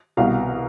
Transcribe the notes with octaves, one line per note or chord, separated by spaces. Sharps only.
C2 B2 F5